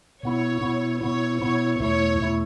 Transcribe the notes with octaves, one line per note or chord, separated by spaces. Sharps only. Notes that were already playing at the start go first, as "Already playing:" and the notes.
B2 B3 E4 C#5
B2 B3 E4
B2 B3 E4 C#5
B2 B3 E4 C#5
E2 B2 A3 E4 C#5
E2 B2 A3 E4